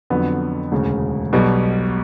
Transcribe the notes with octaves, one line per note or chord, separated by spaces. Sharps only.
F2 D3 F#3 B3
E1 D2 C#3
B1 B2 G3